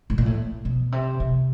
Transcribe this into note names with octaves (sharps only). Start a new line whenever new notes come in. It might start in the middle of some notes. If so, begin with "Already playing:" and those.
A2
A#2
A2
B2
C3
C3